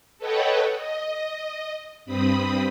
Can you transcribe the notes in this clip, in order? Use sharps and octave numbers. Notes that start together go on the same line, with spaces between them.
A4 B4 C#5 D#5 F#5 G5
D#5
G2 C4 B5 D#6